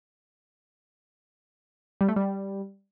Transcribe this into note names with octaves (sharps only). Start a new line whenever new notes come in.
G3
A3
G3